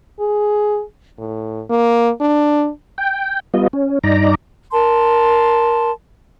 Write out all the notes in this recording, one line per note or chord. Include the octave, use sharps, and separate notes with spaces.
G#4
A2
A#3
D4
G5
G3 B3 F4 D#5
C#4
G2 D#4 D5 A#5
A#4 A5 C6